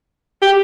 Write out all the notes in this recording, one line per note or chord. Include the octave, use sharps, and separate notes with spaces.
G4